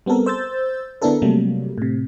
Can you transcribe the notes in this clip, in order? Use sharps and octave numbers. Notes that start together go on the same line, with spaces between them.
G3 B3 C4 A4 A#4
C5 E6 G6 A6
D3 B3 D4 E4 A4 A#4
C3 F#3 G3 A3 A#3
A2 C3